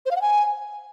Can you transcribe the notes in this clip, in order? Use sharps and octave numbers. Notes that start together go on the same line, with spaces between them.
C5
F5
F#5
G#5